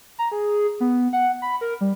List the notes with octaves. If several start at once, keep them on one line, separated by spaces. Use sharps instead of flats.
A#5
G#4
B3
F#5
B5
A#4
G3